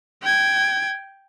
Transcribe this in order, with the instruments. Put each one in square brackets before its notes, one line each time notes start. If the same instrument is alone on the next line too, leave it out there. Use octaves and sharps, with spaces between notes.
[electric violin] G5 G#6